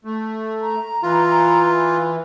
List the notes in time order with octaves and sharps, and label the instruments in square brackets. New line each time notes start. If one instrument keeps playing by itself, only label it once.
[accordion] A3
[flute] A#5
[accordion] E3 [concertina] F4